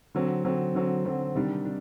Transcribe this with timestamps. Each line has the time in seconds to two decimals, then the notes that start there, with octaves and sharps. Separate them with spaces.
0.15 D3 F#3 C4
0.45 D3 F#3 C4
0.75 D3 F#3 C4
1.05 D3 F#3 C4
1.35 C3 D#3 G3 D4
1.65 D4